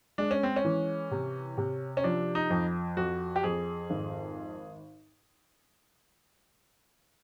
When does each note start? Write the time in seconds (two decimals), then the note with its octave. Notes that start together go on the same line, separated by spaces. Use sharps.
0.18 G#3 D4
0.31 C#4
0.43 C4
0.56 C#4
0.65 E3
1.11 C3
1.58 C3
1.97 C#4
2.04 F3 D4
2.35 D#4
2.50 F2
2.97 F2 F#4
3.36 G4
3.43 F2 G#4
3.90 G#1